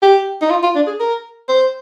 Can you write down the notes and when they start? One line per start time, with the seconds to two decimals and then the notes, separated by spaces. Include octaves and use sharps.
0.02 G4
0.42 D#4
0.50 F4
0.63 F4
0.76 D4
0.87 G#4
1.00 A#4
1.49 C5